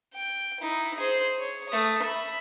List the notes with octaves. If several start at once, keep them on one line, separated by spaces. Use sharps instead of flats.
G5
D#4 E4
G#4 C5
C#5
A3 D#6
E5 B5